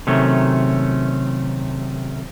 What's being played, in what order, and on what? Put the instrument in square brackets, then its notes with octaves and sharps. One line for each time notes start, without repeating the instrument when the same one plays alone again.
[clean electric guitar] C3 D#3 F#3 A3 C#4